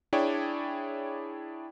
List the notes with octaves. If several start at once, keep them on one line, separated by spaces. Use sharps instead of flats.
D4 E4 G#4 C#5 D5 G5